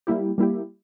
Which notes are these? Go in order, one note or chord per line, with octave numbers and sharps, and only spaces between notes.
G3 A#3 E4 G4
G3 A#3 E4 G4